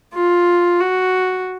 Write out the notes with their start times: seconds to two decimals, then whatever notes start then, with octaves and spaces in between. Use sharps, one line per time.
0.14 F4
0.80 F#4